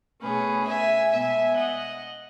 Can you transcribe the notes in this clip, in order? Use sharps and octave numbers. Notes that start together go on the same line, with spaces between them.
B2 A3 C#4 G#4 B4
E5 G#5
B2 G#3 B3 E5 G#5
D#5 F#5